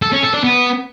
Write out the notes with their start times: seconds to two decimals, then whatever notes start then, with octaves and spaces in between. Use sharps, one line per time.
0.02 A4
0.12 C#4
0.23 A4
0.34 D4
0.44 B3